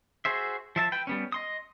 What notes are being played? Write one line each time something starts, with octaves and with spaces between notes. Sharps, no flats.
F#4 G#4 C5 E5
F3 E5 A5
B4 G5
G3 B3 C#4
D#5 C6 D#6